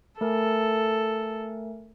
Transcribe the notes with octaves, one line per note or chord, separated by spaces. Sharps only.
A3 A4 A#4 G#5